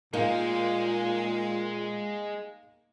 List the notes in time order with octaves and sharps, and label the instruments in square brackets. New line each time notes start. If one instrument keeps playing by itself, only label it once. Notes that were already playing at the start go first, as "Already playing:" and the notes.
[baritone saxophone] A#2 [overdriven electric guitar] G#3 [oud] A#3 [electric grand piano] D#4 F5